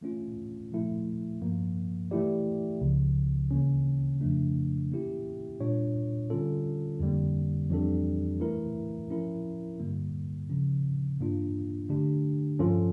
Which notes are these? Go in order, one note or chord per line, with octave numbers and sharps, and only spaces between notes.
E3 A3 C#4 F4
A#2 F3 A3 E4
G2 F3 A#3
E3 A3 E4 G4 D5
C#2 C#3 F3
D2 C#3 E3 A#3 C#4
F2 C#3 F3 A3 D4
E3 A#3 C#4 E4 G4
A#2 G3 D4 F4 C#5
D3 G3 C#4 F4 A4
F2 D3 G3 A#3
F2 E3 G3 D4 A4
E3 A3 E4 A#4
F3 C#4 E4 A#4
G2 D3 G3 A#3
C#3 F3 C#4
G2 E3 A#3 D4 F4
D3 A3 D4 G4
G2 F3 C#4 F4 A4